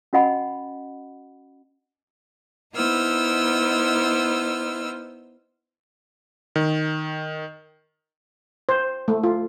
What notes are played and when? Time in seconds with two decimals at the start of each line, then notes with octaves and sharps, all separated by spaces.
0.13 C#4 F#4 D#5 F#5 G#5 B5
2.74 B3 D#4 E4 C5 E6 F6
6.56 D#3
8.69 C5
9.08 A3
9.23 F4